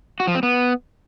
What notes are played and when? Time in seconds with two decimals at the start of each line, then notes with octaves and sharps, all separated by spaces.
0.20 F#4
0.27 F3
0.35 C4
0.43 B3